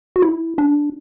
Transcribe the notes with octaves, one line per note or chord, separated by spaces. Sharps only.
F#4
E4
D4